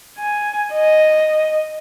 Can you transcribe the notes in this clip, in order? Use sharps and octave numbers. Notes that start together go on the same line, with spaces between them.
G#5
D#5